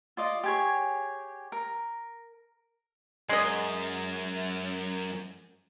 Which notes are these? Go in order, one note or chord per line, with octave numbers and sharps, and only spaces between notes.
F4 D5 D#5
G4 G#4 C#5
A#4
F#2 G#3 D#5